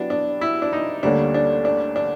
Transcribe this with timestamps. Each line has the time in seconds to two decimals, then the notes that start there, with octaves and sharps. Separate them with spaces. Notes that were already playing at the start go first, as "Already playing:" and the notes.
Already playing: F#3 B3 D4 E4 G4
0.10 D4
0.41 E4
0.62 D4
0.73 D#4
1.03 D2 D3 G3 A#3 C#4 D4
1.34 D4
1.65 D4
1.96 D4